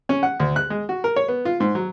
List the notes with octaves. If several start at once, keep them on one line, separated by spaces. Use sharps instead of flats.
C#4
F#5
D2
F#6
G#3
F#4
A#4
C#5
B3
F4
G#2
F#3